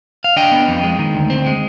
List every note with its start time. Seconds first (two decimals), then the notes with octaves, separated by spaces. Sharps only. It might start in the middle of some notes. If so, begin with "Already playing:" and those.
0.24 F5
0.37 D4 D#5 G5
0.52 B3
0.68 F2
0.83 G#3
0.99 D#3
1.14 D2
1.30 C4
1.46 G#3